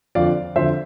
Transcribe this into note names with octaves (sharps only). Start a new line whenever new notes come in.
F2 D3 F3 D5 F5
F2 D3 F3 C5 E5